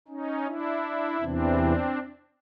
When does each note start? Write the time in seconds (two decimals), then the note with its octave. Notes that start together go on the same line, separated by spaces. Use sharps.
0.08 C#4 D#4
0.46 D4 E4
1.20 E2 C3 E3 C4 D4